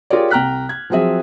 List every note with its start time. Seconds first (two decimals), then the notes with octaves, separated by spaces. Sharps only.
0.10 F4 G4 G#4 A#4 C#5 D5
0.31 C2 G5 A#5 F6 F#6 B6
0.69 G#6
0.90 F3 F#3 C4 G#4 E5